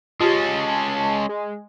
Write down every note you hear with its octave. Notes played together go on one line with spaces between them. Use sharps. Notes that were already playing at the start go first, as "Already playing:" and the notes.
G#3 C#4 F4 G4 A5
G#3